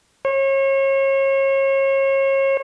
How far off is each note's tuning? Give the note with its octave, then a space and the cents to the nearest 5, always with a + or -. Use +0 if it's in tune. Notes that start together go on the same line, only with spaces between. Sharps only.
C#5 -35